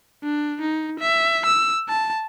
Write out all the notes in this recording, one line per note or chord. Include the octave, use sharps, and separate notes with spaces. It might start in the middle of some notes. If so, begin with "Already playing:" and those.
D4
D#4
E5
E6
A5